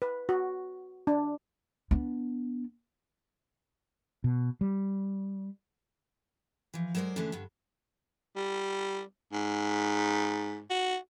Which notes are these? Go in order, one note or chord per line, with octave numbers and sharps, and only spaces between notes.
B4
F#4
D4
B3 D4
B2
G3
E3 F3
F#3 G#3 A#4 C5 D5
D3 E3 G#3 A3 C#4 D4
G2 D3
G3
G#2
F#4